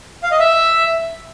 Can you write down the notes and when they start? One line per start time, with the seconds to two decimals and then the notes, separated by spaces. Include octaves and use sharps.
0.23 F5
0.31 D#5
0.40 E5